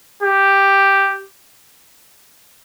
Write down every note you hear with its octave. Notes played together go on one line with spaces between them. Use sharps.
G4